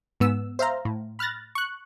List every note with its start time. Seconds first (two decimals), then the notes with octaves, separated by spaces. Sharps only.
0.20 G#2 B3 E6
0.59 C5 E5 F5 A#5
0.85 A2
1.19 B5 F6 F#6 A6 A#6
1.55 C#6 F#6